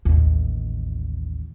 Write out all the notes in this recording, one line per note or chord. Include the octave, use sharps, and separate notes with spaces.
A1 D#2